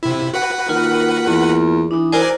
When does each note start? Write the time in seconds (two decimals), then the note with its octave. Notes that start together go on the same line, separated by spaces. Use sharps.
0.03 C3 E4
0.34 F#4 B4 F#5
0.69 D#3 A#3 F4 A#4
1.26 E2
1.91 E3 D4 D#4
2.12 E4 F#4 A#4 C5 D5 G#5